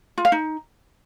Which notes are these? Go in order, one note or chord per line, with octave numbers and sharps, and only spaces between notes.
F4
F5
D#4